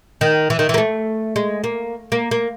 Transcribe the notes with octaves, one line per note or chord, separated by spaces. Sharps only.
D#3
E3
D#3
E3
A#3
A3
G#3
A#3
A#3
A#3